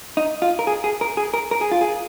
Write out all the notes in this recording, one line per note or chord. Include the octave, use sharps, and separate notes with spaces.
D#4
F4
A#4
G#4
G#4
A#4
G#4
A#4
A#4
G#4
F4
G#4